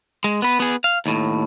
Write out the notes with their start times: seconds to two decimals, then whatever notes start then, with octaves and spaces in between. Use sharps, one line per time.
0.24 G#3
0.42 B3 B4
0.60 B3 G#4
0.84 F5
1.06 D#2 A2